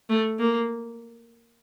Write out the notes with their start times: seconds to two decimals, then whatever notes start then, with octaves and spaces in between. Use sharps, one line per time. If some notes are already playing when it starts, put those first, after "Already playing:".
0.10 A3
0.39 A#3